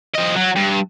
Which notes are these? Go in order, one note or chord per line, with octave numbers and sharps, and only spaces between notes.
F3 D#5
F#3
G2